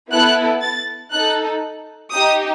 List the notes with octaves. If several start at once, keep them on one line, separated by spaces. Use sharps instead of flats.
B3 E4 A4 F#6
A6
D#4 A4 F#6
D#4 G4 D#6